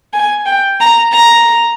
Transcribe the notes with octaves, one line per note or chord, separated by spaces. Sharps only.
G#5
G5
A#5
A#5